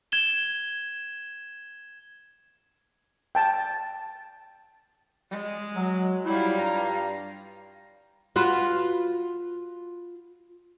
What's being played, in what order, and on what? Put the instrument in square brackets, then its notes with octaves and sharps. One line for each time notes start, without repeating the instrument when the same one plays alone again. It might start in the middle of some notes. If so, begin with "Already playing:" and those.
[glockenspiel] G#6 E7 G7
[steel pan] G5 A5
[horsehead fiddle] G#3
[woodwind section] F#3
[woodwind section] F#3 E4 [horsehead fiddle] G3 F4
[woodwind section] G2 A#5
[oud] F4 F#4 B4